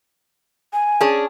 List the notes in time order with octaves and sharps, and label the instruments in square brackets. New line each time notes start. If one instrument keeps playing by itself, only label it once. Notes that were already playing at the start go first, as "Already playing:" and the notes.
[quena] G#5
[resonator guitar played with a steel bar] C#4 D4 G#4